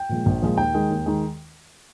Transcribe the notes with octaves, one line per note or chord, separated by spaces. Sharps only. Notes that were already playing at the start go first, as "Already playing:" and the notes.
Already playing: G5
A#2 F3 G#3
A#1
A#2 F3 G#3
D#2 G5
D#3 G#3
D#2
D#3 G#3